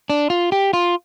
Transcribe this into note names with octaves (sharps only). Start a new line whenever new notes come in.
D4
F4
G4
F4